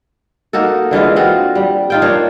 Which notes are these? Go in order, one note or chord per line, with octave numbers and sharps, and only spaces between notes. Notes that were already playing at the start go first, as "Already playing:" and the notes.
A#3 D#4 F#4 A4
D3 E3 G#3 F4
C4 F4 F#4
G3
D#4 F4 G5
A#3 D4 C#5